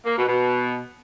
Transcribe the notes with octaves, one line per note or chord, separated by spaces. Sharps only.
A#3
B2
B2